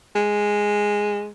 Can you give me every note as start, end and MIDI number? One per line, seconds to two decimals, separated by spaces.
0.15 1.28 56